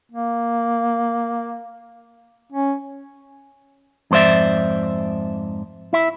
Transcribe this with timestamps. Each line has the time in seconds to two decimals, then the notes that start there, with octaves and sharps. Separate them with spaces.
0.12 A#3
2.52 C#4
4.11 F2 G#2 C5 D5 E5
5.93 E4 E5